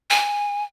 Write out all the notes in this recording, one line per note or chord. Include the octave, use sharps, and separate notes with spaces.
G#5